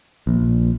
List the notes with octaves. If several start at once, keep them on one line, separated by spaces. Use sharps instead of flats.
A#1